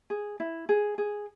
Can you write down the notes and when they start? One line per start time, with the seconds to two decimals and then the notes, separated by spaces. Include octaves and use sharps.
0.10 G#4
0.40 E4
0.69 G#4
0.98 G#4